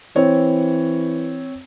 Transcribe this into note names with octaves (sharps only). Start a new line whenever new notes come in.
E3 C4 C#5